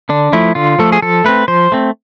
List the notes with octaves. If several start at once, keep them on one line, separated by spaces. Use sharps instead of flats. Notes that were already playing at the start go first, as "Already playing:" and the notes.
D3 D4
F3 A3 E4
D3 F4
F3 A3 A4
G#4
F3 A4
A3 C4 B4
F3 C5
A3 C4